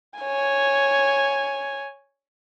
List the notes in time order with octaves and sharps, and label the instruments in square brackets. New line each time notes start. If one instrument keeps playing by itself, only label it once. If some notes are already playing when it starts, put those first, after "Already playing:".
[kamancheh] C#5 G#5